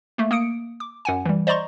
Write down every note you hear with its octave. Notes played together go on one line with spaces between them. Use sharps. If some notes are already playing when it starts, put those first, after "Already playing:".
A3 A#3
A#3 D#6 C#7 D7
D6
F#2 F#5 G#5
E3 G3
C5 D5 D#5 A#5 C6 C#6